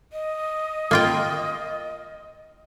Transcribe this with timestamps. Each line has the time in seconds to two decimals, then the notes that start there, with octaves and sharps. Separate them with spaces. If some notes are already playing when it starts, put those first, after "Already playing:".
0.13 D#5
0.91 A#3 F4 G5